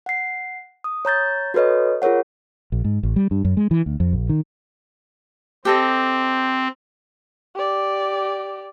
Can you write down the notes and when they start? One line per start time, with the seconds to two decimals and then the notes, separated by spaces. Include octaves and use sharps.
0.06 F#5 C7
0.84 D#6
1.05 C#5 A#5 G6 A6
1.54 F#4 A4 B4 C#5 D#5
2.02 F4 G#4 A#4 C#5 F#5
2.72 A#1
2.85 G#2
3.03 A1
3.16 G3
3.31 G2
3.45 F#2
3.57 G#3
3.71 E3
3.86 D2
4.00 F2
4.13 A#1
4.29 D#3
5.65 C4 G4 A4 D#5
7.55 G4 D5